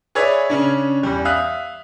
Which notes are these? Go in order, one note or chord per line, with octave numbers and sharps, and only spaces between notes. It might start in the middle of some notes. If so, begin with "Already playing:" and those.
G#4 B4 C#5 D5 E5
C#3 C#4 D4
E2 G3
E5 F5 D#6 F#6